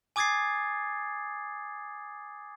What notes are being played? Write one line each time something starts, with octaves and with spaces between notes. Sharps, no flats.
G#5 D6 D#6 G#6 A6 C7